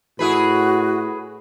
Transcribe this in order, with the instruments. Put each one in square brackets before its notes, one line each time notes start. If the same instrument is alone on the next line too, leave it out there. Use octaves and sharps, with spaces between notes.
[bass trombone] A2 [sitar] E4 G#4 B4 [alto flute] F#4